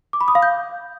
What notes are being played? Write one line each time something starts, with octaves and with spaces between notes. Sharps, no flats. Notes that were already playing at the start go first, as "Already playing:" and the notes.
D6
B5
D#6
F5
G6